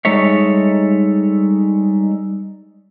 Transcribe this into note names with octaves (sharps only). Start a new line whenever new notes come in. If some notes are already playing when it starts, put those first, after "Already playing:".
G3 G#3 D#4 A4 C#5 E5